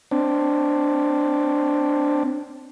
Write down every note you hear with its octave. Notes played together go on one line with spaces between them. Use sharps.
C4 D4